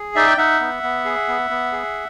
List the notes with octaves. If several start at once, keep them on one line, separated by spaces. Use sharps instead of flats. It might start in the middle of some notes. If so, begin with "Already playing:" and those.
Already playing: G#4
D#4 D5 E5
G5
D#4 E5 F#5
B3
B3
G#4
B3
B3
G#4